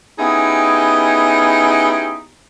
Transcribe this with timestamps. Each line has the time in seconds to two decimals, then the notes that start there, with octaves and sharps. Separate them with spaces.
0.18 B3 C#4 D#4 E4 G4 G#4